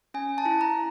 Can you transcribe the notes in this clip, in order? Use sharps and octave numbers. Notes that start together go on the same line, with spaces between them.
C#4 G#5
A5
E4
A#5